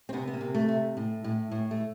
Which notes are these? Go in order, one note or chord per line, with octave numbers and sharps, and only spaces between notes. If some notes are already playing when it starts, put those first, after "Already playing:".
C4
C3 B3
B3
A#3
C3
A3
C3
A2
A2
A2
A3